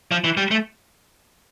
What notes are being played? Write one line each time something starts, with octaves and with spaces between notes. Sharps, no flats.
F3
E3
G3
A3